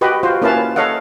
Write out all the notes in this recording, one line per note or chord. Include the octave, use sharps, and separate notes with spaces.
F#4 G4 B4 D#5
F4 F#4 C5
A#3 C#4 E4 B4 F5 A5
A4 C#5 D#5 F5 F#5